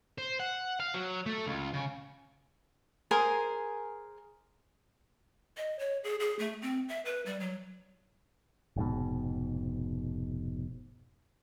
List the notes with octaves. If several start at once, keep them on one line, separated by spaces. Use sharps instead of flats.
C5
F#5
F5
F#3
A3
C#2
C#3
G#4 A#4 C5 G#5
D#5
C#5
G#4
G#4
A3
C4
E5
B4
G3
F#3
F1 G#2 B2